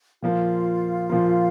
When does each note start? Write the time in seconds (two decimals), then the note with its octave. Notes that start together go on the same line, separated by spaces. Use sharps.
0.23 A#2 F3 A#3 F4
1.10 A#2 F3 A#3